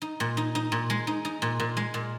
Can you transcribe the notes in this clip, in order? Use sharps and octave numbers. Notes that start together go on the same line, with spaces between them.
D#4
A#2
D#4
D#4
A#2
G#3
D#4
D#4
A#2
A#2
G#3
A#2